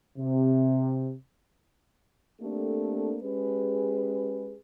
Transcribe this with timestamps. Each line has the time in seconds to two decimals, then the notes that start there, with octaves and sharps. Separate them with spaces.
0.18 C3
2.41 A3 A#3 C4 D4 G4 A4
3.22 G#3 C#4 G4 G#4 B4